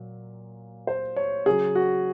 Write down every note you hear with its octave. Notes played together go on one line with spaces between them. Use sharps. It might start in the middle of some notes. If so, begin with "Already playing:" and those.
Already playing: A#2 F#3
C5
C#5
C#3 F#3 G#4
F#4